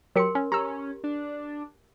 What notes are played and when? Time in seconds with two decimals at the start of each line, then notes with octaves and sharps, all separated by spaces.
0.16 F#3 G4 A#4 C6 C#7
0.35 C#4
0.52 C#4 G4 A#5 E6
1.04 D4